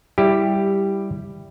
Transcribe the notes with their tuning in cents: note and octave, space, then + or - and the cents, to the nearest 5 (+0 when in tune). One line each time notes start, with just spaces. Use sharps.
G3 +0 E4 +0 G4 +5